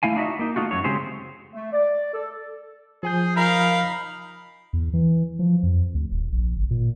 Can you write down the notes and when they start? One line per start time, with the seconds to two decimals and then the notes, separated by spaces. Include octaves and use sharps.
0.03 A3 E4 F5 G#5
0.16 D4 D#4 F#4 D#5 E5
0.39 A#3 D#4
0.56 A3 D#4 F4 F#4
0.71 F#2 F#3 C#5
0.84 C#3 G#3 C4 G4 G#4 C5
1.53 A3
1.73 D5
2.14 A4
3.03 F3 G#4 G#5 G6
3.36 D#4 A#4 F5 B5
4.73 E2
4.93 E3
5.39 F3
5.63 F2
5.94 D2
6.11 D#1
6.32 A#1
6.56 G1
6.70 A#2